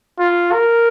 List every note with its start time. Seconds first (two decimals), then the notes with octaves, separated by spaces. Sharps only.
0.19 F4
0.52 A#4